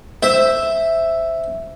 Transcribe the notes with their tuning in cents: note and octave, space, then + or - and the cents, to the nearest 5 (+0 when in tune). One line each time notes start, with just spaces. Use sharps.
C5 +0 E5 +0